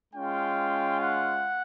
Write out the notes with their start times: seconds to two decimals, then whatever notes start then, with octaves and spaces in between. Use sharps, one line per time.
0.14 G#3 C#4 F4 G5
1.00 F#5